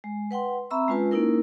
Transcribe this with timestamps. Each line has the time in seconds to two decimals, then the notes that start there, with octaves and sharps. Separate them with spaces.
0.04 G#3
0.31 B4 F#5 G5 C6
0.71 C4 E5 A#5 B5 C#6 E6
0.88 G#3 C#4 F4 B4 A5
1.11 A#3 C#4 D#4 E4 A#4